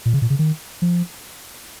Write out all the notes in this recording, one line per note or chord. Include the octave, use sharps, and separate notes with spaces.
A#2
C#3
A#2
C#3
D#3
F3